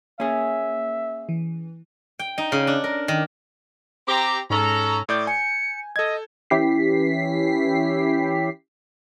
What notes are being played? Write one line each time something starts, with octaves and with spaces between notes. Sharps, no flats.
A#3 C#4 G#4 E5
E3
G5
D#4
C#3
D4
A#4
D#3
C4 G4 A#5
G#2 C#4 A4 A#5
A2 D5 D6 G6
G#5 C#7
A4 D#5 G#6
E3 C#4 E4 G4 B6 C7